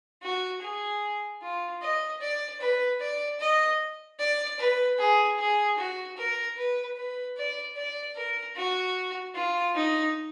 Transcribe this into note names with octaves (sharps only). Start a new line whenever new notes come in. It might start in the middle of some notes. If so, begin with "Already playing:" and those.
F#4
G#4
F4
D#5
D5
B4
D5
D#5
D5
B4
G#4
G#4
F#4
A#4
B4
B4
D5
D5
A#4
F#4
F4
D#4